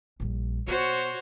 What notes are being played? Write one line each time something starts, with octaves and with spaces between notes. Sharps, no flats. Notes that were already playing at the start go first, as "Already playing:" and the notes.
A#1 G3
B2 F#4 C5 C#5